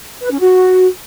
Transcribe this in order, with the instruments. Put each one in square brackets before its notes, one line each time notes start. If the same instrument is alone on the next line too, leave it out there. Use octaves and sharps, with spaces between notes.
[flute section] B4
C#4
F#4